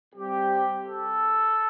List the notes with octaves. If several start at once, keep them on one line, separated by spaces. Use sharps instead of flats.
C3 G3 C4 G4
A4